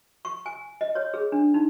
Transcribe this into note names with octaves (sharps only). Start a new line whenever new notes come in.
C#6
G#5
D#5
C#5
G#4
D4
D#4